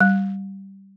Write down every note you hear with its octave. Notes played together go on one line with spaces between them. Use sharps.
G3